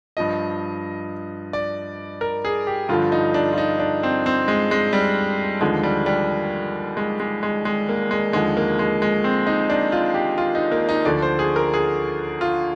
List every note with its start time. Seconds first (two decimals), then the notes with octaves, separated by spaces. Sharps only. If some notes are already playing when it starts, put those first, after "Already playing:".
0.17 G2 F3 D#5
1.53 D5
2.21 A#4
2.45 G#4
2.67 G4
2.89 G2 D3 F3 F4
3.12 D#4
3.34 D4
3.53 F4
3.58 D#4
3.79 D4
4.03 C4
4.26 C4
4.48 G#3
4.71 G#3
4.93 G3
5.61 D#2 D3 F3 G#3
5.83 G3
6.06 G3
6.97 G#3
7.20 G#3
7.43 G#3
7.65 G#3
7.89 A#3
8.11 G#3
8.33 D#2 D3 F3 G#3
8.57 A#3
8.79 G#3
9.02 G#3
9.24 C4
9.47 D#4
9.70 D4
9.92 F4
10.14 G4
10.38 F4
10.55 D#4
10.71 A#3
10.89 D#4
11.05 D2 D3 F3 D5
11.22 C5
11.39 G#4
11.56 A#4
11.74 G#4
12.41 F4